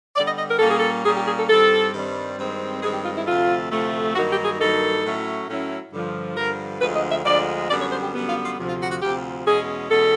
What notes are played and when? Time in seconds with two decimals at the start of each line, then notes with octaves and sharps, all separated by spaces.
0.16 D3 G3 B3 D5
0.28 D#5
0.38 D#5
0.49 A#4
0.59 A#2 G3 A#3 C#4 A4
0.69 G#4
0.79 A4
1.05 A#2 G3 A#3 C#4 G#4
1.16 G4
1.27 G#4
1.38 A4
1.49 G2 D#3 G3 C4 A4
1.94 G2 D#3 G3 C4
2.39 G2 D#3 G#3 C4
2.82 G2 D#3 G#3 C4 G#4
2.93 G4
3.05 F4
3.16 E4
3.26 D2 C3 F3 A3 F4
3.71 D2 C3 F3 A3
4.15 G2 D#3 F#3 A#3 D#4 F#4
4.30 G4
4.45 G#4
4.60 G2 D#3 F#3 A#3 D#4 A4
5.04 A2 F#3 A3 C#4 E4
5.48 A2 F#3 A3 C#4 E4
5.92 G2 D3 F3
6.37 G2 D3 F3 A#4
6.81 D2 D3 F3 G#3 B4
6.95 D#5
7.10 E5
7.25 D2 D3 F3 G#3 D5
7.70 F#2 D3 G3 B3 D5
7.81 C#5
7.92 C5
8.02 G4
8.14 F#2 D3 G3 B3
8.29 F4
8.44 F4
8.59 D2 C3 F3
8.69 F4
8.81 F#4
8.92 F#4
9.02 D2 C3 F3 G4
9.46 E2 B2 G#3 C#4 G#4
9.91 E2 B2 G#3 C#4 A4